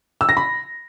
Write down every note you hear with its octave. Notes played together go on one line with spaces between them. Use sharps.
E6
A#6
B5